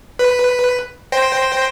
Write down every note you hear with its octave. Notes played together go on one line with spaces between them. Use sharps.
B4
C5 G5 A#6